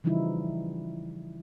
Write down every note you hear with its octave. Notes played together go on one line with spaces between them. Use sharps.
C#3 E3 F3 G3 D#4 E4